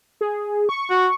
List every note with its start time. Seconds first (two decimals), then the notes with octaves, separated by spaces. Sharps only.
0.21 G#4
0.69 C#6
0.90 F#4